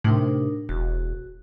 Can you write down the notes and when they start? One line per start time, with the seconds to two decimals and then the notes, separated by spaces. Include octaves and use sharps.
0.04 A2 C3 D4 D#4 A#4
0.69 E1 F#4